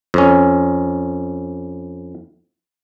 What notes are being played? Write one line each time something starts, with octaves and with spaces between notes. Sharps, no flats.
F2 C#4